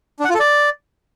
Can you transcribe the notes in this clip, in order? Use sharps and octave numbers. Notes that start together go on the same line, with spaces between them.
D4
F#5
F4
A4
D5